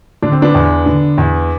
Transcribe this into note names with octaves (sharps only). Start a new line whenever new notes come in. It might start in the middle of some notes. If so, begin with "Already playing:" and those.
D3 D4
C4
B3 D4
E2
D3
E2